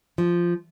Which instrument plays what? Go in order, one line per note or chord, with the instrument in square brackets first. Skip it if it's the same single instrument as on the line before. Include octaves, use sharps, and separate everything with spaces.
[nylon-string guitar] F3